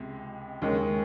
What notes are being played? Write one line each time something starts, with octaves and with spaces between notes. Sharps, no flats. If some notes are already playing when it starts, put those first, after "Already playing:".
Already playing: C#2 C3 G#3
D#2 C#3 G#3 C#4